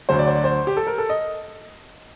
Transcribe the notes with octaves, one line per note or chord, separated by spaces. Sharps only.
D2 D3 F#3 C5
D5
C5
D5
C5
G4
A4
A#4
A4
D#5